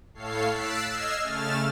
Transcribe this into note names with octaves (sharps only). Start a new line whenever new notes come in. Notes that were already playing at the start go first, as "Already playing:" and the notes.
A2 A4 C#5 F5 C7
E6 F#6 A6 B6 C7 D7
D#5 E6 F6 G#6 C7
C#3 A3 F6 A6 E7